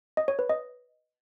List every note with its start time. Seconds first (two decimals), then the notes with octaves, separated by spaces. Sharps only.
0.17 D#5
0.28 C#5
0.39 B4
0.49 D#5